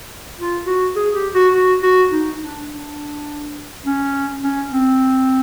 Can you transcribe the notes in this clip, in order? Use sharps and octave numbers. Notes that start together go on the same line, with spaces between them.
F4
F#4
G#4
G4
F#4
F#4
F#4
D#4
D4
D4
C#4
C#4
C4